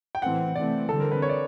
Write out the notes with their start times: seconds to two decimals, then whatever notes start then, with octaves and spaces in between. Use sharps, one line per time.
0.15 G5
0.22 A2 E3 A3 C4 F#5
0.55 C3 E3 A3 C4 D5
0.89 D3 G3 C4 A4
1.00 A#4
1.12 B4
1.22 C#5
1.29 D5